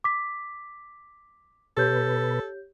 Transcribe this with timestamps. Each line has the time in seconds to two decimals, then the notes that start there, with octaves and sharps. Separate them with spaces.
0.04 D6 B6
1.77 B2 G4 A4 B4 C#5 G6